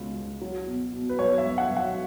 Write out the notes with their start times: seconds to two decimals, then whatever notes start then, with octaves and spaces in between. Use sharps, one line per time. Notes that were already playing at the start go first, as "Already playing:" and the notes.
Already playing: C#2 B2
0.15 C#2
0.41 F#3
0.67 B2
0.93 B2
1.09 B4
1.19 B1 C#5
1.38 E5
1.45 B1
1.58 F#5
1.70 B1
1.76 F#5